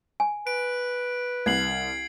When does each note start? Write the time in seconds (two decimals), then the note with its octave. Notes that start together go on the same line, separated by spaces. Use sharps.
0.20 G#5
0.47 B4 D7
1.46 C2 G#6 C7 F#7